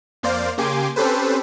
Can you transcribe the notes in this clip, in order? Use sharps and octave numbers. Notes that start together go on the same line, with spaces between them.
F2 A#3 C5 D5 F5
C#3 A#3 G4 G#5 C6 D6
C4 C#4 G4 A4 B4 C5